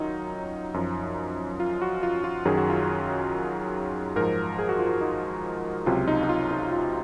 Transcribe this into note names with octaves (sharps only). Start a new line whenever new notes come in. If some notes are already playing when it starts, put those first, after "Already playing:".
Already playing: F#2 D#3 F#3 D#4 F4
F#2 F3
F4
F#4
F4
F4
F#2 D#3 F#3 G#4
F#4
F4
F#4
G#2 F3 A#4
G#4
F#4
F4
F#4
D#4
C#2 C3 F#3 F4
D#4
D#4
F4
D#4
F4